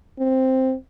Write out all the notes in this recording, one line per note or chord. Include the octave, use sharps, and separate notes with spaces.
C4